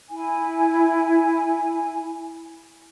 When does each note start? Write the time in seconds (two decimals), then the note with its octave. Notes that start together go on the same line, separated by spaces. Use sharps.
0.10 E4 G#5